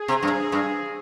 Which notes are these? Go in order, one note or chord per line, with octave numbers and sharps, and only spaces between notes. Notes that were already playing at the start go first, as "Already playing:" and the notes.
Already playing: G#4
C3
G2
G2